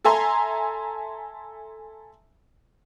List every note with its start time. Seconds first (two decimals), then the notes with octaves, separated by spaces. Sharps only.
0.05 A4 E5 G#5 A#5 C6